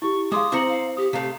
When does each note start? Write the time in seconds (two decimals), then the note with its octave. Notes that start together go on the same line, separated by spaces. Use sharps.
0.02 E4 G4 C#6
0.32 G#3 F5 C6 D6 D#6
0.52 C4 E4 C5 A#5 C#7 F#7
0.69 F5
0.97 G4 D#6
1.13 C3 A3 F5